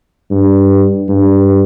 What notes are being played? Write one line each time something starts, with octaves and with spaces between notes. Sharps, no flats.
G2
G2